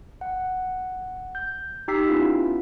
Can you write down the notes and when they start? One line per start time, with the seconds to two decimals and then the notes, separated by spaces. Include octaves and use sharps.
0.21 F#5
1.35 G6
1.88 D#4 G4 G5 E6 B6 C7
2.08 B3 C#4 E4 F4